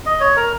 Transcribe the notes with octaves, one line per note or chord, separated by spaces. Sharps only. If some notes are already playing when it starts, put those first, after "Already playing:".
D#5
C#5
A#4